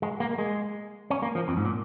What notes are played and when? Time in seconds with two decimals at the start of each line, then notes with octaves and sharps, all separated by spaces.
0.02 G#3
0.20 A#3
0.31 A#3
0.38 G#3
1.10 C#4
1.23 A#3
1.35 F3
1.48 F2
1.57 G#2
1.65 A#2